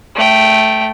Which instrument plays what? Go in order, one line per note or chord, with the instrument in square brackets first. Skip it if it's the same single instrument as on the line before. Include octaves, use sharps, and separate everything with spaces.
[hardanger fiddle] A3 G5